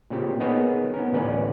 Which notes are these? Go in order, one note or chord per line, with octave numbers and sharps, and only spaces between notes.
A#2 C#3 C4 G4
B3 D#4 G#4 A#4 B4 C#5
B3 C#4 A#4
A1 D2 C#4 B4 D5